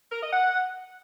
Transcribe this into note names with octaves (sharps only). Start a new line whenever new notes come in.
A#4
D#5
F#5